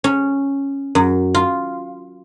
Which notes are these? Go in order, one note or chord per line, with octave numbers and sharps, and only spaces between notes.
C#4
F#2
F4